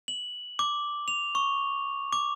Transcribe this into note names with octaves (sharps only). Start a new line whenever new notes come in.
F#7
D6
F7
C#6
D6